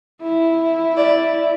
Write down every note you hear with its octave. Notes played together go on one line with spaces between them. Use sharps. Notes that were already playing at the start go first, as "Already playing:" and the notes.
E4
D5